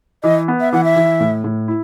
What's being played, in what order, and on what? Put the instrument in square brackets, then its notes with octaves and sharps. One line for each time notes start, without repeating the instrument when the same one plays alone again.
[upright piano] E3 [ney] D#5
[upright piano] B3
[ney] E5
[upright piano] E3 [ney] F#5
[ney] E5
[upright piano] E3
A2
A2
E4